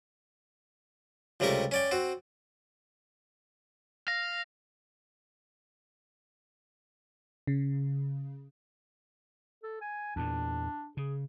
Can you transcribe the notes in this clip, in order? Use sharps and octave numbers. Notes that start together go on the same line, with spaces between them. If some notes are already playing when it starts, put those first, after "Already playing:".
C#2 C3 G3 A3 A#4 C#6
C#4 D5 G5
C4 F#4
F5 A#6
C#3
A4
G#5
E2 A#2 D4
C#3 G#4